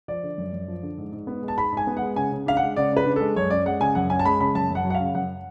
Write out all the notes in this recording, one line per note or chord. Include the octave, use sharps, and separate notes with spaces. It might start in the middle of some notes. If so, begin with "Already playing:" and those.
F3 D5
D3
F#2
F#2
F3
D3
G#2
G#2
B3
G#3
A5
G#2 B5
G#2 G#5
B3
F#5
G#3
C#3 G#5
C#3
D4 F5
F#5
G#3
C#3 D5
C#3 B4
D4
G#3 A4
F#2 C#5
C#4 D5
G#3 F#5
C#3 G#5
F#2 F#5
C#4 G#5
A5
G#3 B5
C#3 B5
F#2 A5
F#2 F#5
F#3
F#5
F5
C#3
F#2 F#5